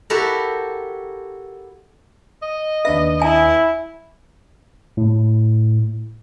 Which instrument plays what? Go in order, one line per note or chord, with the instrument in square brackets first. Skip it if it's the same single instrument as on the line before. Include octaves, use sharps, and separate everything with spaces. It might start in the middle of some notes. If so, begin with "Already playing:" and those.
[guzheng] E4 F#4 G4 A4 A#4
[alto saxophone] D#5
[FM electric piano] D#2 D4 B4 [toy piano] E5
[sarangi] E4 [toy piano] G#5
[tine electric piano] A2